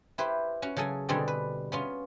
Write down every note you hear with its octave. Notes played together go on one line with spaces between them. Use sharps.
E4 G4 B4 C5
C#4 F#4
C#3 F#3 G#4 A4 G#5
B2 D3 G3 C4 G#4 D5
B4
B3 C#4 F4